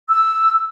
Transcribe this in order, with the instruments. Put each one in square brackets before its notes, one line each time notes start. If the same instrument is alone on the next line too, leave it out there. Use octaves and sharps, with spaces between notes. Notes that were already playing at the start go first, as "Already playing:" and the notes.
[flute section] E6